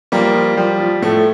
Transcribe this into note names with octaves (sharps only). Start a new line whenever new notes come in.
F3 G3 A#3
F3
F3 G3
F3
A2 A3